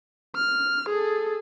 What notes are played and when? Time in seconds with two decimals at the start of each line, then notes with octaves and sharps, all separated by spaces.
0.36 F6
0.89 G#4 A4